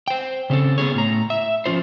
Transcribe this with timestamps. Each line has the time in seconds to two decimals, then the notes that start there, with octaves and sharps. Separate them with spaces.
0.08 C5 G5
0.50 C#3 C4 C#4 A4
0.78 B3 C#4 F#4 G#4 C#5
0.94 A2 A#5
1.30 E5
1.66 F3 C#4 F4 C5